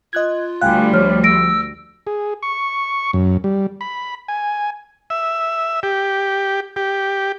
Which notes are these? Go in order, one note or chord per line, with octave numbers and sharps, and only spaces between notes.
F4 D#5 F#6 G#6
D2 G3 F5 G5 G#5 F#6
F3 C#5 F6
E6 A#6 D7
G#4
C#6
F#2
G3
B5
G#5
E5
G4
G4